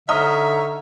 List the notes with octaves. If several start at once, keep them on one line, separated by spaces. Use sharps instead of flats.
D3 D#4 C#5 D#5 E5 A#5 D#6 F6